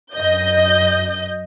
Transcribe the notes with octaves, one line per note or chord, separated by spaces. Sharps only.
F#2 D#5 G6